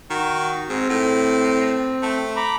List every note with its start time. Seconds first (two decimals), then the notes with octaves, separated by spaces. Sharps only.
0.10 D#3 F#4
0.69 G#2 C4
0.90 A2
2.03 A3
2.36 A#5 B5 D6